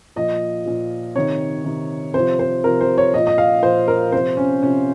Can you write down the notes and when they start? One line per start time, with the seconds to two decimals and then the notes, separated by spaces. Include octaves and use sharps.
0.16 A#2 F3 D#5
0.66 A#2 F3
1.16 C3 D#3 C#5
1.65 C3 D#3
2.14 C3 F3 C5
2.39 C5
2.64 C3 F3 A#4
2.81 C5
2.98 C#5
3.14 A#2 F3 D#5
3.27 D#5
3.38 F5
3.63 A#2 F3 C5
3.88 A#4
4.12 C3 F3 C5
4.37 C#4
4.63 C3 F3 C#4